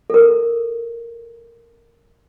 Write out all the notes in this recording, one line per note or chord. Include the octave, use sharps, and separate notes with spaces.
A4 A#4